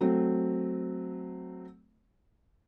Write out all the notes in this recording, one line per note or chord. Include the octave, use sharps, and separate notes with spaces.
F#3 A3 C4